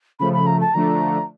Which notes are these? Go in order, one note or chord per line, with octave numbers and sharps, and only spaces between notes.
C#3 F3 A3 B5
B5
A#5
A5
D3 F3 A3 D4 A#5